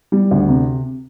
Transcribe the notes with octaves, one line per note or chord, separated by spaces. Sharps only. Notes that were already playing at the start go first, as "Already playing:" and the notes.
G3
D2
C3